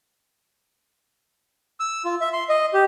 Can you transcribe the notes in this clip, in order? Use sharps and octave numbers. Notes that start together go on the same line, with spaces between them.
E6
F4
E5
C6
D#5
G4